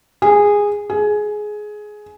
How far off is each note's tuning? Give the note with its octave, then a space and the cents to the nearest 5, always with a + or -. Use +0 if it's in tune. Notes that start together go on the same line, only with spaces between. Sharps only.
G#4 -15
G#4 +15